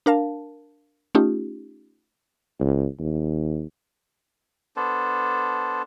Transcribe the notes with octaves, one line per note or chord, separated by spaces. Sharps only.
D4 A#4 F5 A5
A3 C#4 D#4 F4 G4
C#2
D#2
B3 D4 A4 C5